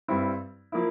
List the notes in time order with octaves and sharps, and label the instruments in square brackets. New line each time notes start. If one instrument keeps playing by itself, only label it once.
[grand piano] G2 G3 C4 E4
F3 A#3 E4